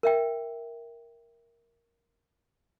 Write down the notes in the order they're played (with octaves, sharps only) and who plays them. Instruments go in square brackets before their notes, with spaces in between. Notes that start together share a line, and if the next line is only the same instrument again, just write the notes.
[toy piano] A#4 E5 G5